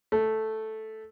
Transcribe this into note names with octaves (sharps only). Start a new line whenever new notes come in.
A3